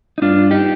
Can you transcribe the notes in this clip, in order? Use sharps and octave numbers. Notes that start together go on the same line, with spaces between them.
D#4
G2 D4 F4
D#4 G4